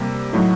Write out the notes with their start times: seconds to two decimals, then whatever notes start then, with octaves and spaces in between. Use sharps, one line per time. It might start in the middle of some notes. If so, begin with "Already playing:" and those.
Already playing: C3 G3 A#3
0.33 A2 F#3 A3 D#4